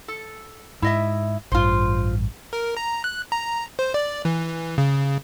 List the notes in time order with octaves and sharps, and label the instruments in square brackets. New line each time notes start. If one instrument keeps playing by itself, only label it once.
[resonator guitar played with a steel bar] A4
[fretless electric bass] G#2 [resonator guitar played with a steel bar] E4 D#5 E5
[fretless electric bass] A1 G2 [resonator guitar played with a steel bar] F4 C5
[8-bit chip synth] A#4
A#5
F#6
A#5
C5
D5
E3
C#3